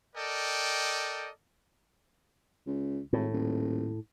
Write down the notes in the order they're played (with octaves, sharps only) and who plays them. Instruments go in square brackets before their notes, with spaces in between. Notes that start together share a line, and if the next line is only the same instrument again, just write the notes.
[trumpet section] A4 A#4 D5 D#5 G5
[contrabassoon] C#2
[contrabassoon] G#1 [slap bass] A2
[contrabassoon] D#1